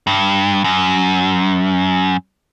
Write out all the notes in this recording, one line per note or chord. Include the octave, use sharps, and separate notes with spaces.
G2
F#2